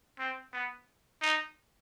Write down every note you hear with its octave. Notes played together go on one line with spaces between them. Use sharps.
C4
B3
D#4